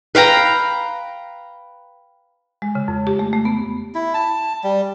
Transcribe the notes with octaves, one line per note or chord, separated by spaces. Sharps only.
B4 F5 G5 A#5
G#3
C#3
F2
G4
A3
A3
B3
E4
A5
G3